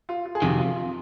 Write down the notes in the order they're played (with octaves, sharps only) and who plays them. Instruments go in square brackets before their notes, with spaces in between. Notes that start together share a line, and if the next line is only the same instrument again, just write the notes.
[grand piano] F4
F4
G#4
[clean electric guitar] F2 C3 D#3 [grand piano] F#4
[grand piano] F4
F4